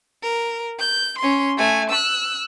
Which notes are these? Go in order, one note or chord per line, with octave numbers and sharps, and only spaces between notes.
A#4
G6
C#4 C6
A3 G#5
E6 F#6